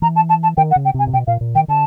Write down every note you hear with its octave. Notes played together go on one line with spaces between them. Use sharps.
E3 A#5
A5
A5
A5
D#3 G5
F#5
C#3
G5
C3 G#5
A#2
B2 G5
A#2 F5
A#2
D#3 G5
D3 A5